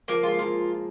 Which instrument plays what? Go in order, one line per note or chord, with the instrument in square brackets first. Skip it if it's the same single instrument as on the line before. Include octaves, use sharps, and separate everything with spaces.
[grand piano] F3 [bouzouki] A#3
[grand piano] G#3 [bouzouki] F4
[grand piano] F3 A#3 [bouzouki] F4